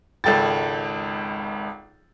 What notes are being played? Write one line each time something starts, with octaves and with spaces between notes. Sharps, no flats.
G#1 C#2 A4 G5 A6